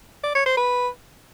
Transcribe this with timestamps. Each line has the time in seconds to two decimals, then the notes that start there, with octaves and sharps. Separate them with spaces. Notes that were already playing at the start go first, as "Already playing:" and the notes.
0.24 D5
0.35 C#5
0.46 C5
0.57 B4